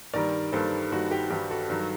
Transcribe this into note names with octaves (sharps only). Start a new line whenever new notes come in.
G2 D#3 G3 A#4 D5
G2 D#3 G3 A4 C5
G2 D#3 G3 F#4
G4
G2 D#3 G3 G4
F#4 A4
G2 D#3 F#3